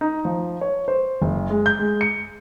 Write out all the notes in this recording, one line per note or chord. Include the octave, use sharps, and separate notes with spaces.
D#4
F3
C#5
C5
F#1
G#3
G6
G#3
C#7